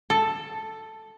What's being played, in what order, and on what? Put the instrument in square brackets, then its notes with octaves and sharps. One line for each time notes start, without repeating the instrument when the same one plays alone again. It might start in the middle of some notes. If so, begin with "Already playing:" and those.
[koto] A4